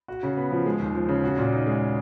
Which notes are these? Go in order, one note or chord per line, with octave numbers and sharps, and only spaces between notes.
F#4
C#3
B3
F3
G#3
D#2
F3
C#3
F#4
A#2
D#4
G#3